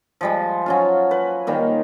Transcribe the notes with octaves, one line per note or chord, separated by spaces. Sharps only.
F3 G3 G#3
F#3 C#4 F4
B4
D#3 G3 A#3